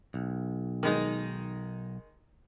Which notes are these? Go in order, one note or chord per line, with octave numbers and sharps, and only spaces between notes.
B1
D#3 G#3 D#4